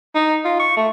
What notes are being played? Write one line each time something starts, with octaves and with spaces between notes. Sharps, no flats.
D#4
F4
C#6
A3